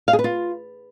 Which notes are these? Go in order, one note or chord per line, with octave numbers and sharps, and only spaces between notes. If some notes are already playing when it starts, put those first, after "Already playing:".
F5
G#4
B4
F4